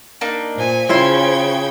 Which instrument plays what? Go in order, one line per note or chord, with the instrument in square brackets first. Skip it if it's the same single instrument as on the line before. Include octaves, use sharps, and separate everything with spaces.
[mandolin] A#3 D4 D#4
[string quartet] A#2 G#5 [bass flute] C5
[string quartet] C#3 G5 G#6 [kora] E4 F4 [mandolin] C#5 G#5 C6